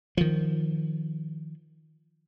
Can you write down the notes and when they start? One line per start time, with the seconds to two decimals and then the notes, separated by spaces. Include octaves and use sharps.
0.17 D#3 F3